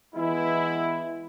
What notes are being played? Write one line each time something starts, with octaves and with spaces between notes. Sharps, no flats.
E3 G#3 B3 E4